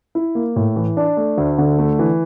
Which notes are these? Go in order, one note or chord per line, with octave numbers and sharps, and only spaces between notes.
E4
A#3
A2
E3
D4
A3
D2
D3
A3
E3